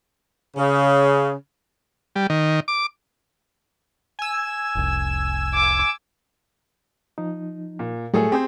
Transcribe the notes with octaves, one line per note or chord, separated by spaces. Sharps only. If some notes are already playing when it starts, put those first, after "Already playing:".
C#3
G3
D#3
D6
G#5 E6
F1 C2
D6
F3 D#4
A#2
A2 F#3 G3 A3 G#4 A4
C4 G4 G#4 C5